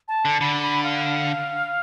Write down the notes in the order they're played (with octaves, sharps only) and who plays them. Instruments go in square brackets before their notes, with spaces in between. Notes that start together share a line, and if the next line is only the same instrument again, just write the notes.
[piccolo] A5
[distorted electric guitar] D3
[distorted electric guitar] D3 [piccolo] B5
[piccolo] B5
F5